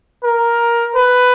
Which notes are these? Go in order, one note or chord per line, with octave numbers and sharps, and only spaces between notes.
A#4
B4